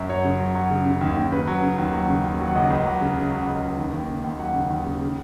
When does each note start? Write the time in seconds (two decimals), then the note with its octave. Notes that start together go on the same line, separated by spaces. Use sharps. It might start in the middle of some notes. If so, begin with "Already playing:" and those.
Already playing: F#2
0.09 F#3 C#5
0.25 C#3
0.39 F#3
0.55 F#3
0.70 C#3
0.86 C#3
1.01 D#2
1.17 D#2
1.32 C#3 B4
1.47 F#3
1.62 C#3
1.78 D#2
1.93 F#3
2.09 C#3
2.24 D#2
2.40 F#3
2.47 F#5
2.55 C#2 D#5
2.70 C#2
2.86 F#3
3.01 C#3
3.17 C#3
3.32 F#3
3.47 C#2
3.62 C#2
3.78 D#2
3.93 D#2
4.08 C#3
4.24 D#2
4.39 F#3 F#5
4.54 C#3
4.70 D#2
4.86 C#3
5.01 C#3